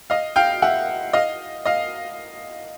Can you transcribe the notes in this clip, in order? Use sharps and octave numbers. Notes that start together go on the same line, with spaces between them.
D#5 F5
F5 G5
E5 F#5
D#5 F5
D#5 F5